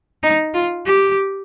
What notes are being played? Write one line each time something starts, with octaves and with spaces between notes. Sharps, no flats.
D#4
F4
G4